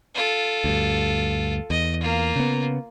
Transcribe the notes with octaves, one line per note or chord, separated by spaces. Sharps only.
F4 A4
D2 G2
E2 D#5
A#3 F4
C#3 B3